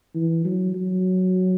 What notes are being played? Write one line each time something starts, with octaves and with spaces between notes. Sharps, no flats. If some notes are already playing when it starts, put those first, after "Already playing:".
E3
F#3
F#3